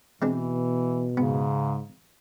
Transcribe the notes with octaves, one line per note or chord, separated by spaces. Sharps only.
B2 E3 G#3 C4 D4
G#2 C#3 B3